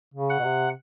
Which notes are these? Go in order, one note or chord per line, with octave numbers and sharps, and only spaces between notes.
C#3
F#5
B2
C3